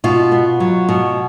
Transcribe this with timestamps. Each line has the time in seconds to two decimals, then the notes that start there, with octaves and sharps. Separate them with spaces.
0.04 B2 F4
0.32 B3
0.60 F#3
0.89 B2